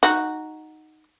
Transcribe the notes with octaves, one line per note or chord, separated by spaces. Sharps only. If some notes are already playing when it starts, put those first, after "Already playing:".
D#4 F#4